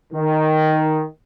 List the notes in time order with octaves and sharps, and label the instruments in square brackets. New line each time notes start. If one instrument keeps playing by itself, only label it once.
[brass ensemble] D#3